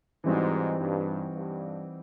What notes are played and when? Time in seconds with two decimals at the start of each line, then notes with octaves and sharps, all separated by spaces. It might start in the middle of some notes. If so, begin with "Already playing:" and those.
0.24 G#2 E3 G3 C4 D#4 F#4
0.79 G2
1.35 G2